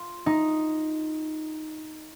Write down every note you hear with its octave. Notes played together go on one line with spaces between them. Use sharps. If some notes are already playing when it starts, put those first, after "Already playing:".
Already playing: F4
D#4